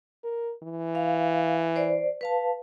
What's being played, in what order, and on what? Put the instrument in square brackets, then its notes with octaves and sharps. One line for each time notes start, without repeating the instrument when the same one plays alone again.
[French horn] A#4
E3
[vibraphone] F5
C5 D5
B4 F5 A5